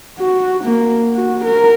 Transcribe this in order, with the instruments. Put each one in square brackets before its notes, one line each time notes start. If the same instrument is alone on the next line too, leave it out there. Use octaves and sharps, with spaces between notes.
[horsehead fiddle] F#4
A#3
F#4
A#4